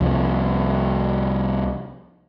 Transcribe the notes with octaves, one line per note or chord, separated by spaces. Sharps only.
C2 F3